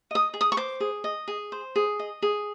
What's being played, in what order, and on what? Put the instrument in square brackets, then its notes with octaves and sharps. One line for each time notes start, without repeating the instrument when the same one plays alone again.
[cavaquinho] D#5 D#6
G#4
D#6
C#6
C5 D6
G#4
D#5
G#4
C5
G#4
D#5
G#4